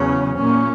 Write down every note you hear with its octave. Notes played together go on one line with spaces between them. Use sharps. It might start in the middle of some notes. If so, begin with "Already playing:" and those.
Already playing: E2 C#3 F#3 C#4
A#2 A#3 C#4